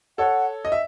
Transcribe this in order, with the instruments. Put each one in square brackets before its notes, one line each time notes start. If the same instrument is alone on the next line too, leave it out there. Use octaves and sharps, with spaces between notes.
[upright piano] A4 C#5 [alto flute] F#5
[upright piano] D#5
E5